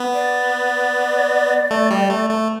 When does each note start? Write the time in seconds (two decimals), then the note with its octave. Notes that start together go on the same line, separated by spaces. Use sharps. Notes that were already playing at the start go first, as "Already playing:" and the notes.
Already playing: B3
0.14 D5
1.71 A3
1.91 G3
2.10 A3
2.30 A3